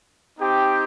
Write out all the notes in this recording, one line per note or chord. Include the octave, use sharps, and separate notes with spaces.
C4 D#4 G4